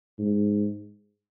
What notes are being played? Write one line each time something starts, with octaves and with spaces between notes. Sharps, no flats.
G#2